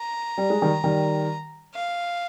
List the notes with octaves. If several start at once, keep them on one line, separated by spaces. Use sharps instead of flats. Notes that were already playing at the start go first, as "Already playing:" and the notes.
Already playing: A#5
G3
G#3
D#3 G3
D#3 G3
F5